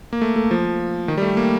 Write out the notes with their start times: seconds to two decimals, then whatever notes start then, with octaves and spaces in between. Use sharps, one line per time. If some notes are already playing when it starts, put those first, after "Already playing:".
0.13 A#3
0.22 A3
0.36 A3
0.51 F3
1.08 D#3
1.17 G3
1.22 A3
1.37 A#3